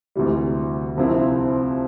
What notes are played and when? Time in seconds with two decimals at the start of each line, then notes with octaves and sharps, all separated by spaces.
0.16 D2 C3 E3 G3
0.97 C2 C3 F3 C4 E4